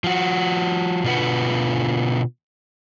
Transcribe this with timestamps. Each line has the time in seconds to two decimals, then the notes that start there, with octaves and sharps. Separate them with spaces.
0.04 F3 F#4
1.04 B2 D3 F4 B4 F#5